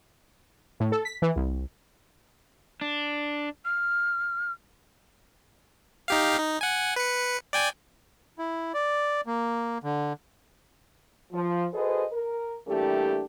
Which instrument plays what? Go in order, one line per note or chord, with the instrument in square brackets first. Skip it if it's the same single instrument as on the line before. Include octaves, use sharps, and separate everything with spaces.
[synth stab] A2
A4
B6
E3
C2
[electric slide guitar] D4
[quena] F6
[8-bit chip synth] D#4 G4 F5
D#4
F#5 G#5
B4 C#7
D5 G5 G#5
[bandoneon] E4
D5
A#3
D3
[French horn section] F3
F#4 G#4 A4 B4 C5 D#5
A#4
E3 G3 A3 A#3 D4 G4